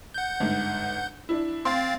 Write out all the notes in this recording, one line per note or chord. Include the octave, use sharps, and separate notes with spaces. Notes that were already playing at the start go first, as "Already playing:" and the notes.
F#5 G6
G1 G#2
D4 E4
C4 F5 C6 A6